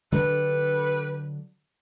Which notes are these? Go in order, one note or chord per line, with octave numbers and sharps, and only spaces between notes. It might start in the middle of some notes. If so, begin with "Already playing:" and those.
D3 F#3 D4 G4 A4 B4